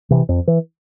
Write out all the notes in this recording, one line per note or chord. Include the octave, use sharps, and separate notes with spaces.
C3 E3
F2
E3